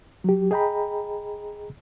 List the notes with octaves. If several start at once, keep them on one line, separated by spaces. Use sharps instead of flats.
F#3 G4
G#4 D#5 G5 A#5 B5